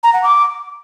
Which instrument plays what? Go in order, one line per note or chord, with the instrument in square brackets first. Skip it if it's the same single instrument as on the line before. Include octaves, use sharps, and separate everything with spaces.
[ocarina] A#5
F#5
D6